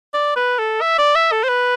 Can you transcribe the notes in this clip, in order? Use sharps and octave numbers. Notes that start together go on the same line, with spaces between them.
D5
B4
A4
E5
D5
E5
A4
C5
B4